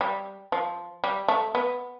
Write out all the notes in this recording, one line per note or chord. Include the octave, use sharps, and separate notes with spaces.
G3
F3
G3
A3
B3